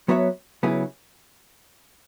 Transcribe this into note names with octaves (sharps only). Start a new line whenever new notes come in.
F#3 B3 F#4 C#5 E5
C#3 F#3 B3 E4 G#4